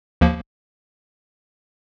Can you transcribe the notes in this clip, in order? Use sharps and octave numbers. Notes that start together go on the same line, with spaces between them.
D#2 F3 A#3